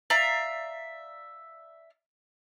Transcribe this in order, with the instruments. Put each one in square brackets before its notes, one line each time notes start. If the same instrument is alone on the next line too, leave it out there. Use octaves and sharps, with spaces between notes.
[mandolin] D5 E5 F5 A#5